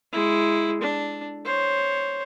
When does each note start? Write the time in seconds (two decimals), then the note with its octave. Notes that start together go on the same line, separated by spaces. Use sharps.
0.12 G#3 E4
0.82 D4
1.45 C5 C#5